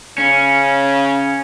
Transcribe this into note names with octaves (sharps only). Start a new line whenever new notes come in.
C#3 C#4